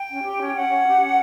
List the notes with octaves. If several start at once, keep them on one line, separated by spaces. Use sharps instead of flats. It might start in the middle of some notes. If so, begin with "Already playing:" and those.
Already playing: G5
C#4
G4
C#4
C#4 F#5
C#4
G4
C#4